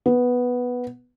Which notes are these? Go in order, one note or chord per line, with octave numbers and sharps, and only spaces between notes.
B3